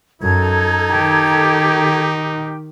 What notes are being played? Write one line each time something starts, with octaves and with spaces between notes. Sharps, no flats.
F#2 D#4 A4 A#5 G#6
D#3 G4